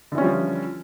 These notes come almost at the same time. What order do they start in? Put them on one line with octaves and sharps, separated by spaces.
D3 E3 C#4 G3 F3